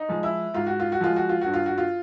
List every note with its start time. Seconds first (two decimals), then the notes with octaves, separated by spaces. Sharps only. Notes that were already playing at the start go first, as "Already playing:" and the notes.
Already playing: D#4
0.09 F3 G#3
0.23 E4
0.54 G#2 F4
0.67 F#4
0.80 F4
0.92 F#4
1.01 F3 G#3 F4
1.16 F#4
1.29 F4
1.41 G2 F#4
1.54 F4
1.66 F#4
1.78 F4